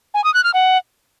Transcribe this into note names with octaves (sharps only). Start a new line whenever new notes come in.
G#5
D#6
F#6
F6
F#5